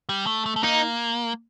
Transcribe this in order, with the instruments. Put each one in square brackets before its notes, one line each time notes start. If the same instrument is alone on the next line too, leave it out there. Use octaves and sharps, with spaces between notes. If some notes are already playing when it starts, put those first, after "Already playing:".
[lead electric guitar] G3
A3
A3
A3
[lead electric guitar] A#3 [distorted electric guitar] D#4